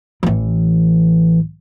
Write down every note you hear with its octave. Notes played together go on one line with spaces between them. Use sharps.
A1 E3